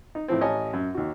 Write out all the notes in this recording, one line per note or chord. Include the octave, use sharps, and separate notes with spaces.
D#4
A2 E3 F3 C4
A1 C#5 D#5 G#5 A5
F#2
D#2 F#4